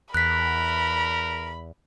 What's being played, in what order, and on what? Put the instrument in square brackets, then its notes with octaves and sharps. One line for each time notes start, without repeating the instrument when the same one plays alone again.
[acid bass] E2 [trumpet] A#4 [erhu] B5 [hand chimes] F#6 B6